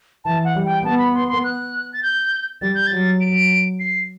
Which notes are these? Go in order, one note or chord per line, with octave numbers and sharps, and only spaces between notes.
E3 A5
F#5
G3
G5
B3 A5
B5
C6
C6
F#6
A6
G6
G3 A6
G6
F#3 A6
D7
C7